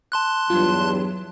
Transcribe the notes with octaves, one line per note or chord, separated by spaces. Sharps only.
A5 C6 F#6
E2 G2 F#3 F4